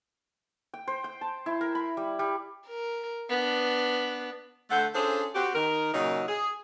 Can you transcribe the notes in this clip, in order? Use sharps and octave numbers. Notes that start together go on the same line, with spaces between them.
G5
C5
G5
A5
E4
A#4
B5
G3
G3
A#4
B3 D4
D3 A3 A4 C5 F#5
C#4 D4 F4 G#4 A4 C5
C4 F#4 G4
D#3 A#4
A#2 C#3 F#3 D#4
G#4